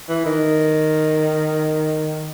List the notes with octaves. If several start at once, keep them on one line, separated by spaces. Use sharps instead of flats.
E3
D#3